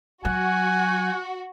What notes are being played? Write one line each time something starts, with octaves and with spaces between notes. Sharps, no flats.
F#3 F#4 G#5 F#6